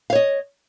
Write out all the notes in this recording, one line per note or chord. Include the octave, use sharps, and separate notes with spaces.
C#5 D#5 F5